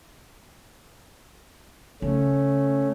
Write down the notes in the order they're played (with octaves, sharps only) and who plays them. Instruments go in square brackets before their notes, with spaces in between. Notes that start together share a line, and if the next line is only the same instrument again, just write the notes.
[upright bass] C#3 [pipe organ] A3 C#4